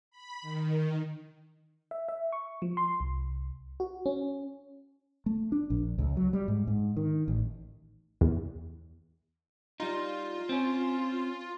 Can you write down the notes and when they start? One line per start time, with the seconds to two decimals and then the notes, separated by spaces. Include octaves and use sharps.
0.11 B5
0.42 D#3
1.91 E5
2.09 E5
2.32 C#6
2.62 F3
2.77 C6
3.00 C2
3.80 F#4
4.06 C#4
5.26 A3
5.52 D4
5.70 A#1
5.98 C#2
6.17 F#3
6.33 G3
6.48 G#2
6.67 G#2
6.97 D#3
7.28 A1
8.21 E2
9.80 G3 D#4 F4
10.49 C4 C#4